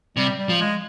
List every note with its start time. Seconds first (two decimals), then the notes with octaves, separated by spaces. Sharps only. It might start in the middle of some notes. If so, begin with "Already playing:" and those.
0.17 C3 G3
0.38 G3
0.49 F3
0.60 G#3